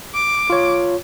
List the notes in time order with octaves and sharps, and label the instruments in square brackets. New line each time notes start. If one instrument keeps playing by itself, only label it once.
[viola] D6
[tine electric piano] F4 C#5